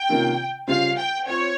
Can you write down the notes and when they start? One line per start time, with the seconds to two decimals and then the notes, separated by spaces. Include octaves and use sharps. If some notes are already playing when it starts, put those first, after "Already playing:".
Already playing: G5
0.09 C3 D#3 A#3 C#4 F4
0.67 C#3 G3 C#4 F4 C5 F5
0.97 G5
1.26 C4 F4 C5 C#5